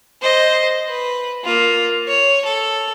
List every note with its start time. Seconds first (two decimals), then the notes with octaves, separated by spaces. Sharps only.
0.22 C5 D#5
0.89 B4
1.44 A#3 F4
2.08 C#5
2.45 A4